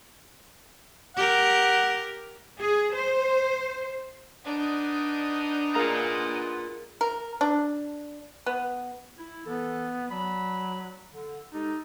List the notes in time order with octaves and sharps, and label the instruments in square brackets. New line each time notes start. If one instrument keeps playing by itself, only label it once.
[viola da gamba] G4 A#4 [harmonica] F#5
[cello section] G#4
C5
[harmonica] B3 D#4 D#5 [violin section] D4
[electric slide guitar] F4 A#5 [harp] G#4 A#4 F5
[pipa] A#4
D4
B3
[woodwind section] E4
[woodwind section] E3 A4 [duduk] B3
[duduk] F#3 [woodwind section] D5 A5 B5
[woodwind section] D3
[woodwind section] G#3 G4 A4 [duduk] D#4